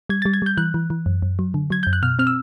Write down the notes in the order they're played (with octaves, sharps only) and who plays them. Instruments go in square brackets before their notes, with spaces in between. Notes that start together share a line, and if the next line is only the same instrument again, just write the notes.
[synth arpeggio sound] G3 G#6
G3 A6
G#6
G3 G6
E3 F#6
E3
E3
F#2
F#2
F#3
D3
F#3 G#6
F#2 G6
F#6
B2 F6
C4 F6
E6